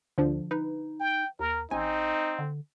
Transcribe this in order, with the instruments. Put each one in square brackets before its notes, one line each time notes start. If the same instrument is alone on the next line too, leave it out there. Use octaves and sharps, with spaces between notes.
[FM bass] D2 [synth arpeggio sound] D3 F3 D4
[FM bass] D#4 [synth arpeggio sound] B4
[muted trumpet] G5
[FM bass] D#2 [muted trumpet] A#4
[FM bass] A1 [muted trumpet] C4 [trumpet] D#4 [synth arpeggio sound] G#5
[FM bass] D3